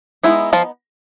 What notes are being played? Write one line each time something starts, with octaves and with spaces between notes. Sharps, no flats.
G#3 B3 D#4 E4
F3 F4